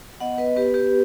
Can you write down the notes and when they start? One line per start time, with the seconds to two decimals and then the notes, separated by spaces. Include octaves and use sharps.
0.20 B3 D#5 F#5
0.38 B4 D#5
0.56 B3 G4 B4
0.74 G4 B4